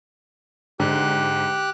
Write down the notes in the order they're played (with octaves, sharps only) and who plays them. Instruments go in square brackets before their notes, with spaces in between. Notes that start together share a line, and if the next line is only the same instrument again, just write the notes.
[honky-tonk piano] G#2 D3 [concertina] G4 F#6